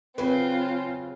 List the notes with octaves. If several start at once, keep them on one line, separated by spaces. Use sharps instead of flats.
C#3 F#3 C4 F4 B4